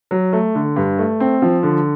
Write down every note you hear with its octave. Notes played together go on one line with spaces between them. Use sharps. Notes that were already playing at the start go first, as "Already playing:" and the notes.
F#3
A3
D3
G2
A3
C4
F3
D3